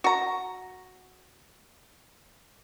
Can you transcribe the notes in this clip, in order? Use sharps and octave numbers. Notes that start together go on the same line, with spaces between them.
F#4 A#5